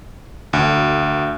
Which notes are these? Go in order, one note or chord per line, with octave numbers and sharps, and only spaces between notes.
D2